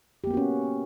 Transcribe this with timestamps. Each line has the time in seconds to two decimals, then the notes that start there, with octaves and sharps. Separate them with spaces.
0.24 G4
0.27 A#3
0.30 B3
0.34 F#4
0.37 C#4